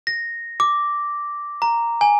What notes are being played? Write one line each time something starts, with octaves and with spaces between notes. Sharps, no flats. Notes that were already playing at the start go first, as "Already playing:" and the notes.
A#6
D6
A#5
G#5